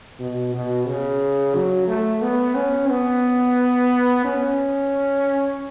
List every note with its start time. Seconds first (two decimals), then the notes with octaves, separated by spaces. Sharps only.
0.20 B2
0.54 B2
0.87 C#3
1.55 F#3
1.88 A3
2.22 B3
2.55 C#4
2.90 B3
4.25 C#4